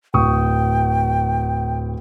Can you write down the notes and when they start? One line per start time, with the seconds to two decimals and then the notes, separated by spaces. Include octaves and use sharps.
0.14 D1 G5 C#6 D#6